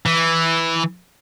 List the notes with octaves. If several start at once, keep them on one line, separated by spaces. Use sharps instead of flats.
E3